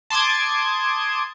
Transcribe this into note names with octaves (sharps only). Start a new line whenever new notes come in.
A5 C6 D6 D#6 G#6